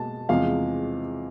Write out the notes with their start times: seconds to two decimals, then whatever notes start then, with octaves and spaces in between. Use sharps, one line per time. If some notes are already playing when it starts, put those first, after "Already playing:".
Already playing: B2 G#3 A5
0.29 E2 C3 F3 G#3 F5